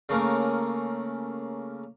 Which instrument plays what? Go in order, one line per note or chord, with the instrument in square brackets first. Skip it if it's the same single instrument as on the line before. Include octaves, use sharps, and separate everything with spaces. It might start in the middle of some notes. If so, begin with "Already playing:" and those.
[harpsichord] C#3 A3 A#3 C#4 A#4